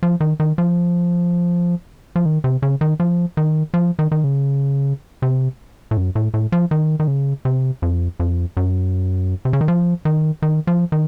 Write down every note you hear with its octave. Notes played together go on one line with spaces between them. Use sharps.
F3
D#3
D#3
F3
F3
D#3
C3
C#3
D#3
F3
D#3
F3
D#3
D#3
C#3
C3
A2
F#2
A2
A2
F3
D#3
D#3
C#3
C3
F2
F2
F#2
C3
C#3
D#3
F3
D#3
D#3
F3
D#3